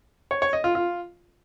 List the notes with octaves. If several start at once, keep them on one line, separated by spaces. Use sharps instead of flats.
C#5
C#5
D#5
F4
F4